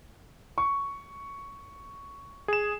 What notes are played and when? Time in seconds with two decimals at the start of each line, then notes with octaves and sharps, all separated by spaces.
0.58 C#6
2.48 G#4 E7